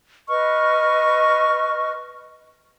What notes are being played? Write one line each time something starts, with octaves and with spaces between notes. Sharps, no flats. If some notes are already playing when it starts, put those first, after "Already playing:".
B4 D#5 C#6 F6